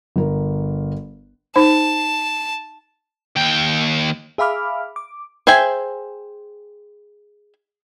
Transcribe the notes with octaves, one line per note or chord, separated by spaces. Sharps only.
G1 A#4
D#4 C5 A5
D#2 G5
G#4 E5 F5 B5 D6 F6
D6
G#4 C5 E5 G5 G#5